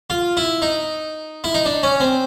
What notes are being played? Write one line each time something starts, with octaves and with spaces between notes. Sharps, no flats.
F4
E4
D#4
E4
D#4
D4
C#4
C4